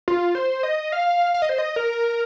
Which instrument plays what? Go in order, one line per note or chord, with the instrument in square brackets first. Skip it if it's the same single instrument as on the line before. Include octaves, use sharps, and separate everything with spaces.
[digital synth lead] F4
C5
D#5
F5
F5
D#5
C5
D#5
A#4